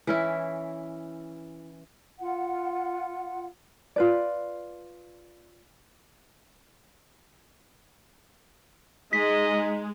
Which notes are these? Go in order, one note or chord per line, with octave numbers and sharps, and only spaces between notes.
E3 C#4 E4
F4 F#5
F4 B4 D5
G#3 D#4 D#5 B6